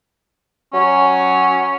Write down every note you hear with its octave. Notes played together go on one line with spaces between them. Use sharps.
F#3 C#4